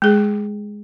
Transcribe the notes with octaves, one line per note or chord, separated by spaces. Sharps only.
G#3 G#4